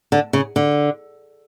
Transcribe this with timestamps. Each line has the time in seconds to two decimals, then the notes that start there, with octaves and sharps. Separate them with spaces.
0.12 D3
0.33 C#3
0.56 D3